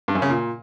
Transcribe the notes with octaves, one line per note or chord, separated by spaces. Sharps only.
G2
F#2
C#3
A#2